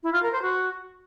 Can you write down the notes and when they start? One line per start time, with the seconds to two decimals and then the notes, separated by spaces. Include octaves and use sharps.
0.03 E4
0.13 F4
0.22 A#4
0.32 C5
0.42 F#4